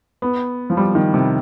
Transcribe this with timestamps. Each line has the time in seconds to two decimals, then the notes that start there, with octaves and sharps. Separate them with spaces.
0.22 B3
0.70 F3
0.77 G3
0.95 D#3
1.14 C3